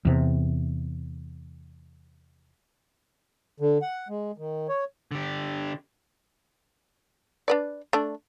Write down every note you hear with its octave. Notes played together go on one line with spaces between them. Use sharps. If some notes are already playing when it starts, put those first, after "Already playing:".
E2 C3
D3
F#5
G#3
D#3
C#5
D3 G4
D4 B4 D5
A3 D4